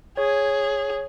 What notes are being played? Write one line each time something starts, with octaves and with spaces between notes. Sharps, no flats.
G#4 C#5